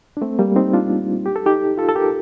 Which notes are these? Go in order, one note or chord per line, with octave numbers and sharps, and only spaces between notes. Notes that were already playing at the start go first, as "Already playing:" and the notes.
D4
A3 C4
G3 A#3
C4 D#4
D4 F4
G4
A4
D#4 G4
F4 A4
A4
G4 A#4